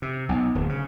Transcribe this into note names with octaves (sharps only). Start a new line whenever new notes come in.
C3
B1
D1
C#3